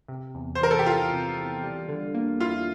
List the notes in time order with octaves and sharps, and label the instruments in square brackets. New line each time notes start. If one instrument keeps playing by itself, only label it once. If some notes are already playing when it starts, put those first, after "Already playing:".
[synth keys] C3
E2
[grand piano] C5
[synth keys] E3 [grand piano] A#4
[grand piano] A4
G4
[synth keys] E2 [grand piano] F4
[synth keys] C3
E2
G3
D3
A#3
[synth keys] E4 [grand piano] F4